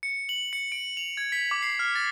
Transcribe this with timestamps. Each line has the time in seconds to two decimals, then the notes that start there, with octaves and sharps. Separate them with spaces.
0.03 C#7
0.29 F#7
0.53 C#7
0.72 D7
0.97 F7
1.17 G#6
1.32 B6
1.51 D6
1.62 C7
1.79 F6
1.96 A6